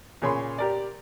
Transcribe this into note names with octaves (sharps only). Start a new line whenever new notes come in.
A#2 C#3 G#4 C#5 B5 C6
G4 A#4 D5